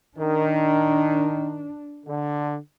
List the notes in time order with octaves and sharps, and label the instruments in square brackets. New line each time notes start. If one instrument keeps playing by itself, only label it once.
[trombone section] D#3 [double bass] D4
[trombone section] D3